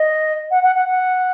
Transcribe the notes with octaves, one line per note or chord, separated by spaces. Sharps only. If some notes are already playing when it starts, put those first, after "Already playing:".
Already playing: D#5
F#5
F#5
F#5
F#5